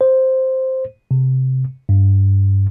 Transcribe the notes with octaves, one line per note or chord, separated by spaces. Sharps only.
C5
C3
G2